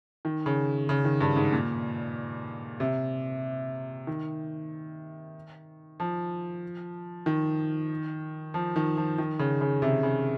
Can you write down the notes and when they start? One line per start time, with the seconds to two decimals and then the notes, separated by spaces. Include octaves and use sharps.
0.25 D#3
0.46 C#3
0.89 C#3
1.04 D#3
1.21 G2
1.36 G#2
1.53 A#2
2.80 C3
4.07 D#3
6.00 F3
7.26 D#3
8.54 F3
8.76 D#3
8.97 F3
9.18 D#3
9.39 C#3
9.61 C#3
9.82 C3
10.03 C#3